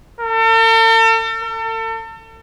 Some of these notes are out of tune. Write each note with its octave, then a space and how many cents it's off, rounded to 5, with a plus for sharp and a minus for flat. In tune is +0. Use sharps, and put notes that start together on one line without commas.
A4 +45
A4 +35